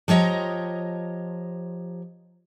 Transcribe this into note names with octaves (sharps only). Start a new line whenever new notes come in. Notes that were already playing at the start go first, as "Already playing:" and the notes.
F3 G4 C#5 D#5 A#5